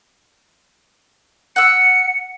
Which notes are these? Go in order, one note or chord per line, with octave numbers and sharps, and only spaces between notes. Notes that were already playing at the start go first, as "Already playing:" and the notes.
F#5 E6 C#7